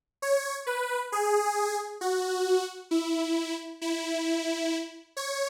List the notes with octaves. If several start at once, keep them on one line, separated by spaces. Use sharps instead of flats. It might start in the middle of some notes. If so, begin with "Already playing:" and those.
C#5
B4
G#4
F#4
E4
E4
C#5